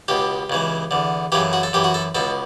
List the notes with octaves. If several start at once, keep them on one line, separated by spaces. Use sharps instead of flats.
C#2 B2 G4
C#2 C#3 E3
E2 D3
F#2 C#3 E3 G4
F#4
A4
F#2 E3 G4
F#4
A4
C#2 B2 A4